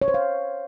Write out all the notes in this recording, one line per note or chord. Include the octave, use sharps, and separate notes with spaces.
C#5
C5
F5